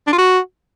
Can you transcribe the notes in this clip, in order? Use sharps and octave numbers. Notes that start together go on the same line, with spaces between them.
D4
F4
F#4